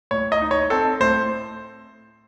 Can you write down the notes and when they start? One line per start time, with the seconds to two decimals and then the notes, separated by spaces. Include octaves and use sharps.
0.11 A2 C#5
0.32 D#5
0.42 D#4
0.51 C#5
0.70 C4 A4
1.00 A2 C5